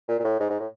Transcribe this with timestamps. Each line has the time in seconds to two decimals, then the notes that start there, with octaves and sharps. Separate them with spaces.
0.08 A#2
0.19 A#2
0.24 A2
0.40 G#2
0.50 G#2
0.59 A2